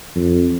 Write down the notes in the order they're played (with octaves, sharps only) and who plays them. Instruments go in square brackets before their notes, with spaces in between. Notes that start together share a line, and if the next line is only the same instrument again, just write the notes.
[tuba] F2